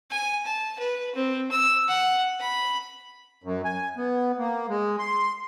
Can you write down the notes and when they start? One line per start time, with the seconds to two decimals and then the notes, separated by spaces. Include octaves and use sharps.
0.10 G#5
0.45 A5
0.79 B4
1.15 C4
1.51 E6
1.88 F#5
2.40 B5
3.44 F#2
3.65 G#5
3.97 B3
4.38 A#3
4.69 G#3
4.99 C6